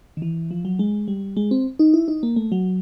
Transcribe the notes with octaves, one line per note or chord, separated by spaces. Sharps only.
D#3
E3
F3
F#3
G#3
G3
G#3
C4
D#4
E4
D#4
A#3
A3
F#3